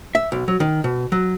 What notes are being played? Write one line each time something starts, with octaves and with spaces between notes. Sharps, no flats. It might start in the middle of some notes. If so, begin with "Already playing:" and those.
E5
B1
F#3
D#3
B2
F#3